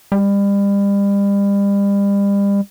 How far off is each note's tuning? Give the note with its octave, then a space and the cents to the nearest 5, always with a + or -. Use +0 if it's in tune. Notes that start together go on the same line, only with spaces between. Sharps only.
G3 +35